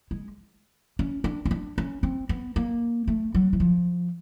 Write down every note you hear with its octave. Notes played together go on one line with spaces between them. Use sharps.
G#3
C#4
D4
C#4
D4
C#4
C4
B3
A#3
A3
F#3
E3
F3